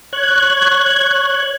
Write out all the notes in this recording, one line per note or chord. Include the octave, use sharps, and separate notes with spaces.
C#5 F#6 G#6